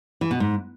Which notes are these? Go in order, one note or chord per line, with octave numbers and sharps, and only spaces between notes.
E3
B2
G#2